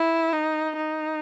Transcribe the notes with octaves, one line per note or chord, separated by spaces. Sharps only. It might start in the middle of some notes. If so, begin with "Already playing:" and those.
Already playing: E4
D#4
D#4